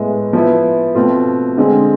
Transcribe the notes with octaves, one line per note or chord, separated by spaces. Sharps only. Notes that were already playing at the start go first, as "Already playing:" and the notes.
Already playing: A2 G#3 B3
F3 B3 E4
B2 A3 C4 F4
D3 G#3 C4 G#4